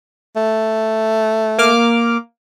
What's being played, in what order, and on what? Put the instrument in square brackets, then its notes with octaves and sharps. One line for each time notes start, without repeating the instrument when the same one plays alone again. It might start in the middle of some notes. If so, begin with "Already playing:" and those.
[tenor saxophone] A3
[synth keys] A#3 D6 F6